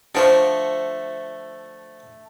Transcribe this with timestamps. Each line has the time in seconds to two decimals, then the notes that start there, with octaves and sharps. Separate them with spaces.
0.15 D3 F3 A3 F#4 C5 C#5